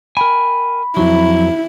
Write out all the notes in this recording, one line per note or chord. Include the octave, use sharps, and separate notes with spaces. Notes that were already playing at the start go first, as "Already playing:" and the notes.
A#4 G5 G#5 B5
F2 F#3 E4